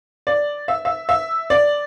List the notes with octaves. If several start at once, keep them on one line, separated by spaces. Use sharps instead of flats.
D5
E5
E5
E5
D5